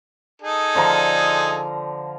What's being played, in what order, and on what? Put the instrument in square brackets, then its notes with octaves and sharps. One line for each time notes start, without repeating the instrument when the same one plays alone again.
[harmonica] D#4 G#4 A4
[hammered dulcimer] D3 F3 A#5